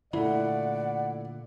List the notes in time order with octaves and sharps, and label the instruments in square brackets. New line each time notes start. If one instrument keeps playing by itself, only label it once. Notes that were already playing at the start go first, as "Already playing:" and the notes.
[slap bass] A#2 D3 [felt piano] A3 E4 [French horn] D5 [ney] F#5